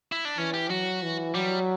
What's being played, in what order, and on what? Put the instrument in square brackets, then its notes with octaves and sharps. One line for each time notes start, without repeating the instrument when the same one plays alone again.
[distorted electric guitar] E4
D4
[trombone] E3 [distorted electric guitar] C#4
[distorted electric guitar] G4
[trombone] F#3 [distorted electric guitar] F#4
[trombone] E3
[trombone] F#3 [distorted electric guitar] G3